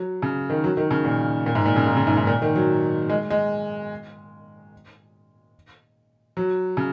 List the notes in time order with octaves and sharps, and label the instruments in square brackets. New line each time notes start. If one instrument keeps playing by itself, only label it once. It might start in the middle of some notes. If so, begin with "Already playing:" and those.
Already playing: [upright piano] F#3
C#3
D#3
F#3
D#3
C#3
A#2
A#2
G#2
A#2
C#3
D#3
C#3
G#2
G#2
A#2
D#3
F#3
G#3
G#3
F#3
C#3